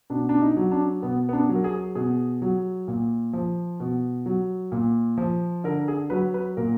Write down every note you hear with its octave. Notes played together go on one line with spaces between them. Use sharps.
B2 D4
D4
D#4
F#3
D4
B2 B3
B3
D4
F#3
A#4
G#4
B2 G#4
F#3
A#2
F3
B2
F#3
A#2
F3
D3 A#4
G#4
F#3 B4
B4
A#2 A#4